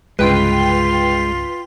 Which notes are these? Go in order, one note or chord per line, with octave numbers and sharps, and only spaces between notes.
C2 G2 C#3 G#3 F4 B4 G5